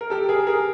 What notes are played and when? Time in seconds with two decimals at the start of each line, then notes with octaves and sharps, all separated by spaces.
0.01 A#4
0.10 G4 A4
0.29 G#4 A#4
0.47 G#4 A#4